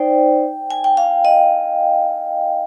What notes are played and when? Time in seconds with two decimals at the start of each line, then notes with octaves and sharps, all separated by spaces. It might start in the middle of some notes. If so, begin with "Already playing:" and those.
Already playing: D#4 C5 D5 G5
0.70 G#5
0.84 G5
0.97 F5
1.25 D#5